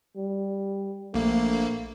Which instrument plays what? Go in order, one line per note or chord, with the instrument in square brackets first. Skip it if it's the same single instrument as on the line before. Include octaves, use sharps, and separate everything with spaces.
[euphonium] G3
[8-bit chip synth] A#1 A#3 [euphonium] A3